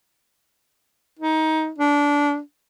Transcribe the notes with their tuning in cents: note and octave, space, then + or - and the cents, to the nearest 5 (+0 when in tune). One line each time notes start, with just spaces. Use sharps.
D#4 +20
D4 -20